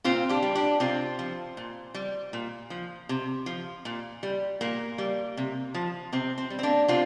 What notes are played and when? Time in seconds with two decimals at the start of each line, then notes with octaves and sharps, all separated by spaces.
0.04 A#2 C4 F4
0.29 D4 G4
0.43 G3
0.55 D4 G4
0.80 C3 C4 F4
1.19 F3
1.57 A#2
1.94 G3
2.33 A#2
2.70 F3
3.09 C3
3.46 F3
3.85 A#2
4.23 G3
4.61 A#2 A#3
4.98 G3
5.37 C3
5.75 F3
6.13 C3 C4
6.38 C4
6.50 G3
6.59 C4
6.63 A#3 D4
6.88 C3 C4 F4